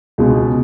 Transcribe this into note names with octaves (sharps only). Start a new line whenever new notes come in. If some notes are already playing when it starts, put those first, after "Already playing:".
C#2 B2 G#3